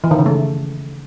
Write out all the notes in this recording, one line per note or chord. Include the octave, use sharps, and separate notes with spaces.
E3
D#3
C#3
A3